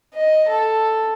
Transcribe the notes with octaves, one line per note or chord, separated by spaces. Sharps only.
D#5
A4